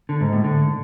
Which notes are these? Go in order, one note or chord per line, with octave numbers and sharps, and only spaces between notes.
D3
G#2
A2
D3